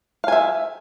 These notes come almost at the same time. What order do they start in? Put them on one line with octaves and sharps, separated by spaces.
F5 G#5 E5